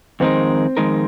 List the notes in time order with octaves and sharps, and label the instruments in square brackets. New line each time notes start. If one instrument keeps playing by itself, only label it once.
[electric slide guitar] F2 D#3 G#3 D#4 A#4 [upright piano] C4
[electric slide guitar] F2 D#3 G#3 D#4 A#4